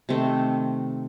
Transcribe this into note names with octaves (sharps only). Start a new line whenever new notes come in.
C3 D#3 A3 C4